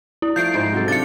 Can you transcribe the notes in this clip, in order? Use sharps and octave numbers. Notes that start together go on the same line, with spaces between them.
E4
F3 A3 G6 C7 D7
G#2 G#3 C5
C3 F#3 A4
C3 D4 F5 A6 C#7